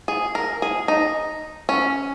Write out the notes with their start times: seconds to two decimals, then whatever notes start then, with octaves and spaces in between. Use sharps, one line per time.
0.08 G#4
0.35 A#4
0.62 G#4
0.88 D#4
1.69 C#4